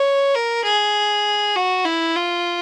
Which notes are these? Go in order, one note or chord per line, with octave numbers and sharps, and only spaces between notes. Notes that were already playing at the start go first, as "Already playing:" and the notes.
Already playing: C#5
A#4
G#4
F#4
E4
F4